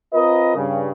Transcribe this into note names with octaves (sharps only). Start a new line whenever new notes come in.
C4 F4 A#4 B4 D#5
G2 C#3